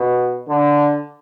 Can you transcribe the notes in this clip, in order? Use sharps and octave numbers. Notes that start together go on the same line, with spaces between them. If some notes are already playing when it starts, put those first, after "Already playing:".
Already playing: B2
D3